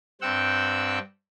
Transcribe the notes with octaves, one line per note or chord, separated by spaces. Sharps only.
G2 C4 F#5 G5 E6